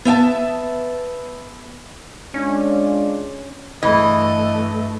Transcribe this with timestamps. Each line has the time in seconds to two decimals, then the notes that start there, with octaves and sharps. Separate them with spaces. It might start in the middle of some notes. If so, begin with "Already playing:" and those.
0.05 B3 E5 G5 A5
2.34 G#3 C#4 D4 F4
3.83 G2 E3 A3 D#5